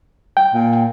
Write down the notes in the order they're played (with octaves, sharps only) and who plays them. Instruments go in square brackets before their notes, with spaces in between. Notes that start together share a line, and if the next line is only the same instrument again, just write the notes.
[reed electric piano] G5
[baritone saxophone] A#2